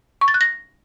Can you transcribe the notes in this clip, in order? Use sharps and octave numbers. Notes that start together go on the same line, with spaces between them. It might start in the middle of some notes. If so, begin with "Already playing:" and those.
C#6
A6
F#6
A#6